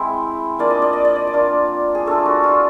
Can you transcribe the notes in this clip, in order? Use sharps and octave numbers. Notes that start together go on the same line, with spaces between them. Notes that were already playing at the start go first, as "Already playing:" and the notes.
Already playing: G#3 C4 E4 C5
A#3 D4 F4 D5
D#5
D5
D#5
D5
D#5
D5
A#3 D4 F4
G#4
A3 D4 F4 A4
F#4
F4